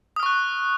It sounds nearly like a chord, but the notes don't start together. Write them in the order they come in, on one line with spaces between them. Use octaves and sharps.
D#6 F6 C#6 F#6